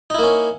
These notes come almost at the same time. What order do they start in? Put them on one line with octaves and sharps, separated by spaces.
D#4 E4 A#3 C#4